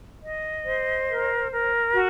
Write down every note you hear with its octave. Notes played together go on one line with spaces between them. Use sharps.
D#5
C5
A#4
A#4
F#4